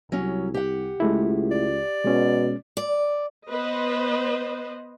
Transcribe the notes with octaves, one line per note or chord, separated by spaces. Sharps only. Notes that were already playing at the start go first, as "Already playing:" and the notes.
C2 F#3 C#4
G4 F#5
C#2 G#3 A3 E4
D5
B2 G#3 C#4
D5
B3 B4 C5 D#5